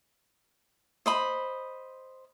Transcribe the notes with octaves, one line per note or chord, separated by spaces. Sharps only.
C5 D#5 B5